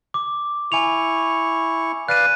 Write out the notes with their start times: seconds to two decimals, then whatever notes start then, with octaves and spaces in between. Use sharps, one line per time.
0.14 D6
0.72 E4 G#5 C#6 F7
2.09 B4 D5 F5 F#6 D#7